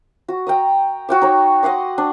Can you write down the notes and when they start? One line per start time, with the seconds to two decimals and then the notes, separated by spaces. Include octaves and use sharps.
0.28 F#4
0.47 G5 A#5 D#6
1.09 F#4 G5 D6
1.22 D#4 C#5
1.63 D#5 F#5 C6 D6
1.98 D4